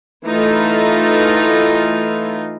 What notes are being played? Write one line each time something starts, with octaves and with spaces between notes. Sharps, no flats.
E3 A3 D#4 F4